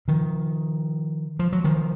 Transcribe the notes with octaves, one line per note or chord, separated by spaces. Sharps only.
D#3 F3
F3
F#3
D#3 F3